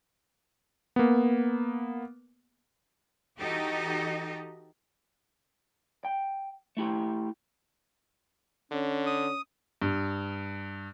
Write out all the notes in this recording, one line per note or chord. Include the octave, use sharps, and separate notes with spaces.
A#3 B3
E3 D#4 F#4 G4 A4 D#5
G5
A3 E4 G4
D3 C#4
D#6
G2